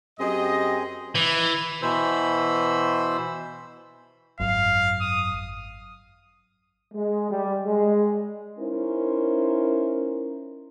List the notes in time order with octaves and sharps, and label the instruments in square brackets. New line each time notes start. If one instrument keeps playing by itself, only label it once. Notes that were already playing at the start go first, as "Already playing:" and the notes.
[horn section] F#2 G4 D#5 [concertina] C4 G#4
[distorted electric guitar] E3
[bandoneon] B2 E3 C5 B5 E6
[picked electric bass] G#1 F#2 [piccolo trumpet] F5
[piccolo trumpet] D#6
[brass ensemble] G#3
G3
G#3
[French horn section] C#4 D#4 E4 A#4 C5